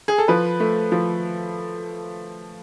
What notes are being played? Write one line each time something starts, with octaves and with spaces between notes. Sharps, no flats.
G#4
A4
F3 B4
A3
F3